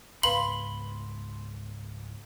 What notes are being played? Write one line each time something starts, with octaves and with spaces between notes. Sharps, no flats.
C#2 G#2 B3 B4 F5 B5 C6 F#7